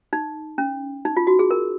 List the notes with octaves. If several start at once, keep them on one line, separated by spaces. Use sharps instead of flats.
D#4
C#4
D#4
F4
F#4
G#4
A#4